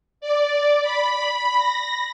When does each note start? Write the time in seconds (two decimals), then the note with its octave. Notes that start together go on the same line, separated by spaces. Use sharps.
0.21 D5
0.82 B5
1.58 A#6